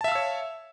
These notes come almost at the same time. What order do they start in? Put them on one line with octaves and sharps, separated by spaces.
A5 E5 F5 E6 C#5